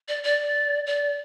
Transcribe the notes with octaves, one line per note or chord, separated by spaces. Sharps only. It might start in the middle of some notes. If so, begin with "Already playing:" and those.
D5
D5
D5